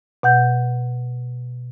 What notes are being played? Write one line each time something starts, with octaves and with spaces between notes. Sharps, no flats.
B2 F#5 G6